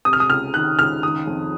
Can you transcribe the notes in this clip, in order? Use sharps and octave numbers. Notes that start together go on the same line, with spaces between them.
C3 D#6
F6
D#6
C#2 F6
D#3 F#6
C#2 F6
D#3 D#6
F2